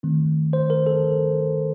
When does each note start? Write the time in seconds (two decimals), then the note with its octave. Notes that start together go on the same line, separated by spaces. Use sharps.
0.03 D#3 A3 C4
0.53 C5
0.70 A#4
0.87 A4